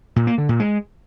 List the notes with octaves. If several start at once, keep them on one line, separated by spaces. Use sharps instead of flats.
A#2
A#3
D3
A#2
G#3